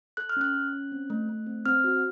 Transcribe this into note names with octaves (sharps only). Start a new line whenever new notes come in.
A4 F#6
F6
C#4 F#6
C#4
C#4
C4
A3
A3
C4
C4 F6
F#4